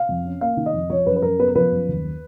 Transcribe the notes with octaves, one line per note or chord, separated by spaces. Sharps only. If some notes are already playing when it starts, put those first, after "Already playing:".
Already playing: F5
F2
C#4
A#3 F5
D#3
D#5
F2
F3 C#5
F#2 B4
B4
F#2 A#4
B3 B4
A#4
F3 B4
F#2
D#2